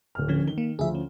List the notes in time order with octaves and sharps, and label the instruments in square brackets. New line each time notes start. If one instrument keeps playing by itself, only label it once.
[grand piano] D1 F6
[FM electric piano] D3 F3 C#4
[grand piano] D#3 G7
[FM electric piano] A#3
[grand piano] D2 F3 [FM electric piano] G#4 E5
[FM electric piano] C#4